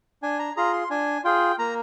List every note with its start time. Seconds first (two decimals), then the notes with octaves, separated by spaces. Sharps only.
0.23 D4 G#5
0.39 A#5
0.57 F4 G#4 A#5
0.73 C6
0.90 D4 G#5
1.24 F4 G#4 G5
1.59 A#3 A#5